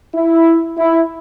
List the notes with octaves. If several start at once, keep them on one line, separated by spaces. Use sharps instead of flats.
E4
E4